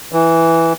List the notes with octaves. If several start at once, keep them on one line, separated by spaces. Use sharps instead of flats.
E3